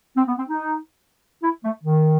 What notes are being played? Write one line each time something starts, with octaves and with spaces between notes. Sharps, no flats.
C4
B3
C4
D#4
E4
A3
D#3